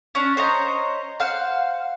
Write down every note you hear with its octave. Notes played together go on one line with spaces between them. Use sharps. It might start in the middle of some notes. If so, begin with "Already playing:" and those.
C#4 D4
C5 C#5 D#5 A#5
C5 F5 F#5